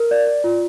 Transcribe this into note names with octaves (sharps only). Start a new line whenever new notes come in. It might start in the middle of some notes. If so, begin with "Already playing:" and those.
Already playing: A#4
D5
D5
F4